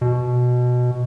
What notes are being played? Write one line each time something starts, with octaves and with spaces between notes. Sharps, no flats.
B2